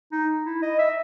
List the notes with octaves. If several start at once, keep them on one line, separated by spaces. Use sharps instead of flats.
D#4
E4
D#5
E5